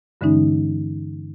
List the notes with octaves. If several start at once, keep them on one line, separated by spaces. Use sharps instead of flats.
G2 D3 E3 G#3 C#4 D#4